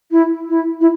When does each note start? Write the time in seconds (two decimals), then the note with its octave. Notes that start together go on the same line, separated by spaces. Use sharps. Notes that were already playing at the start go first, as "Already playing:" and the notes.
0.11 E4
0.48 E4
0.81 E4